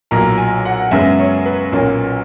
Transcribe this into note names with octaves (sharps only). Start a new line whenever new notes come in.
B1 A#2 F#3 A#5
G#5
F#5
F#2 C#3 G#3 B3 E5
C#5
B4
B1 A#2 A#3 C#4